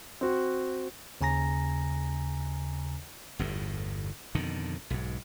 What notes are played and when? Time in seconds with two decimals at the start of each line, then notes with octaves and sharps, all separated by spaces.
0.21 C4 F#4
1.21 D#2 C#3 G#5 A#5 A#6
3.39 G1 E2 A2
4.35 F2 B2 D3 D#3
4.90 B1 G#2